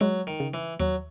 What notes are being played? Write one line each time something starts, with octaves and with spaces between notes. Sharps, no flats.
F#3 G#3
D#3
C#3
E3
D#2 F#3